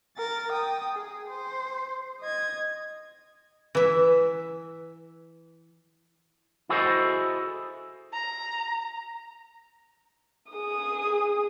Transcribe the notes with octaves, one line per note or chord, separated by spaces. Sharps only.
A#4 A6
G5 D#6
G#4
C5
D#5 G#6
E3 E5
E4 F#4 G#4 A4 C5 D#5
A#5
G#4 D#6